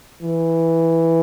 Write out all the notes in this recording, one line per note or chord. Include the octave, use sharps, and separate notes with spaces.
E3